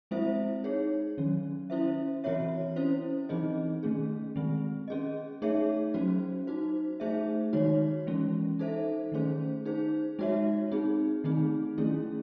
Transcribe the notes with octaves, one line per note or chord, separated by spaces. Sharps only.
G#3 C4 E4 C5 E5
D#4 G#4 C#5
D#3 F#3 C#4
C#4 E4 C5 E5
E3 C4 F#4 C#5 E5
C#4 E4 C5
E3 C4 D#4 G#4 D#5
D#3 A3 C#4 G#4
D#3 G#3 C4
C#4 G#4 D#5
A3 D#4 G#4 C#5 E5
F#3 C#4 F#4 C5
D#4 F#4 C5
A3 D#4 G#4 C5 E5
D#3 G#3 D#4 F#4 C#5
E3 G#3 C#4
D#4 A4 C5 E5
D#3 A3 C#4 G#4 C5
D#4 G#4 C5
G#3 D#4 F#4 C#5 E5
C4 D#4 G#4
D#3 A3 C4 D#4 G#4
D#3 A3 C#4 E4 G#4